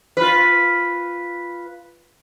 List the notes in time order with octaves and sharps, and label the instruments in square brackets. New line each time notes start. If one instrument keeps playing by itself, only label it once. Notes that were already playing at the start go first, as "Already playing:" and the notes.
[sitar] F4 B4